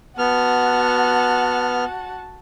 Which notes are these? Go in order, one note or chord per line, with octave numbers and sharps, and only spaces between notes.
B3 F#4 F#5 A5 F6